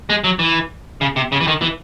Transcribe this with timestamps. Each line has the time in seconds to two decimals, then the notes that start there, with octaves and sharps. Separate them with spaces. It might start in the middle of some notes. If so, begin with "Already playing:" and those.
0.10 G#3
0.24 F#3
0.39 E3
1.01 C#3
1.16 C3
1.32 C#3
1.41 E3
1.47 D#3
1.62 E3